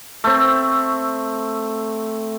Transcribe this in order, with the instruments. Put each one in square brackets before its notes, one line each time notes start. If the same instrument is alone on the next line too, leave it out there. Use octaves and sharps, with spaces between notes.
[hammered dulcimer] A3 C4